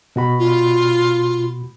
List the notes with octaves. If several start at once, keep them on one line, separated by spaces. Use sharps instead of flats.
B2 F#4 B5
F4